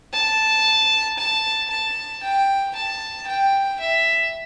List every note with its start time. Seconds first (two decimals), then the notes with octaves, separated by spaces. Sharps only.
0.13 A5
1.18 A5
1.71 A5
2.23 G5
2.76 A5
3.27 G5
3.81 E5